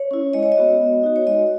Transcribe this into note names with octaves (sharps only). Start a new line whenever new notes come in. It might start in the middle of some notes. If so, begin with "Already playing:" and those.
Already playing: C#5
C#4 E4
G#3 D#5
C#5
D#5
B3 F#4
B3
D#4 F#4
C#5
G#3 D#5